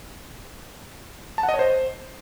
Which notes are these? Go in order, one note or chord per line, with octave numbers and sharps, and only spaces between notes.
A5
F#5
D#5
C#5
C5